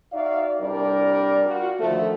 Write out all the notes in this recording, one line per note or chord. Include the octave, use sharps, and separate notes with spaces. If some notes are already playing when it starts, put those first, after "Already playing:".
D#4 F#4 D5 E5 F5
C2 G3 D4 A#4 D5
F4 F#4
D3 D#3 F3 A3